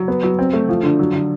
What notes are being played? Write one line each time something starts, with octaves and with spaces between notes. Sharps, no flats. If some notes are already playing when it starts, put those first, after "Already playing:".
Already playing: F#3
B3
F#3
C4
A3
F3
D3
F#3
D3